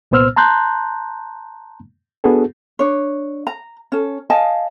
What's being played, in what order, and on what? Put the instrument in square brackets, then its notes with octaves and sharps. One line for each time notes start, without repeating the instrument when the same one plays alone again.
[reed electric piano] C2 A#2 B3 C5 E6 F6
A5 A#5 C6 F#6 G6
B3 D4 F#4 G#4 A4
[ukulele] D4 C#5
A#5
C#4 A4
D#5 F5 G#5 A5